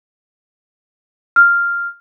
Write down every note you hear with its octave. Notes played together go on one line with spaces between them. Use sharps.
F6